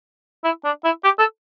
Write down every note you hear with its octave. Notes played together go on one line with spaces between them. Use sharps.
E4
D4
E4
G4
A4